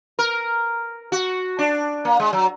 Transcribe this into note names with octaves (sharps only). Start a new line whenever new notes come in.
A#4
F#4
D4
A#3
G#3
F#3